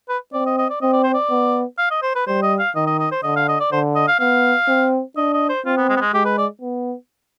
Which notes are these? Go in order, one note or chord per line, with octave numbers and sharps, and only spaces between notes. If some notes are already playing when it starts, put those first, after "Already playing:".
B4
C4 D5
D#5
D#5
D5
C4 D#5
D5
C5
D5
B3
F5
D#5
C5
B4
G3 C5
D#5
F5
D#3 D#5
D#5
D#5
C5
D3 D#5
F5
D#5
D5
D3 C5
D#5
F5
B3 F5
C4
D4 D#5
D#5
C5
C4 F4
B3
G#3
B3
G#3
G#3 G4
B4
D5
B3